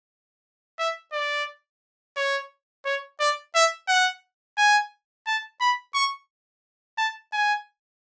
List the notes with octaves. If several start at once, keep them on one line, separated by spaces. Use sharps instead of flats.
E5
D5
C#5
C#5
D5
E5
F#5
G#5
A5
B5
C#6
A5
G#5